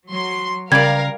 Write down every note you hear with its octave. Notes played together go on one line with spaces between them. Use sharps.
F#3 C6
C#3 G3 A#4 D5 F5 G#6